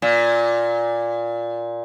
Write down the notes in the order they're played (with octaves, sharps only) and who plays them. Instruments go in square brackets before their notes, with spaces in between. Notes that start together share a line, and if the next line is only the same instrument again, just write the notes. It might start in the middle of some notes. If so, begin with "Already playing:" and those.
[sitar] A#2